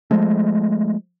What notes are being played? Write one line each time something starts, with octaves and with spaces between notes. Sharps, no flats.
F3 G#3 A3